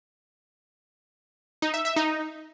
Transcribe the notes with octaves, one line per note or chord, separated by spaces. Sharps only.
D#4
E5
E5
D#4